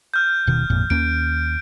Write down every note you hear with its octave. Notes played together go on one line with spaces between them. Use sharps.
F6 G6
D#1 B2 D#3
G#1 F2 A#2
D#2 A#3 C#4 D7